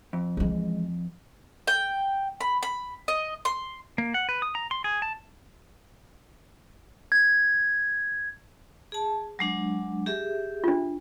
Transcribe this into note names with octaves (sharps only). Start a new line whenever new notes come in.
F2
E3 G#3
G5
B5
B5
D#5
C6
A#3
F#5
B4
D#6
A#5
C6
G#4
A5
G#6
G#4 A5
F#3 G#3 D4
G4 G#4 E5
D4 F4